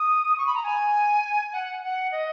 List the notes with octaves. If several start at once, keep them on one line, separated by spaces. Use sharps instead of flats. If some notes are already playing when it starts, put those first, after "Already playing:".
Already playing: D#6
C#6
B5
A#5
G#5
F#5
F#5
D#5